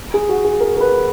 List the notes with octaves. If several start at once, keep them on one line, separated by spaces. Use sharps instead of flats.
G#4
F#4
G#4
A#4
A#4
B4